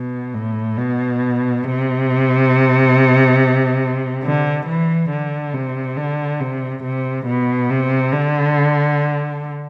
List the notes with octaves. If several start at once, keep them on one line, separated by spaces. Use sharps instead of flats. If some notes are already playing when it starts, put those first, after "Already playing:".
Already playing: B2
A2
B2
C3
D3
E3
D3
C3
D3
C3
C3
B2
C3
D3